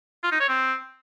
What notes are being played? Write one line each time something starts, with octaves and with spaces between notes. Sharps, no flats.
F4
D#4
C#5
C4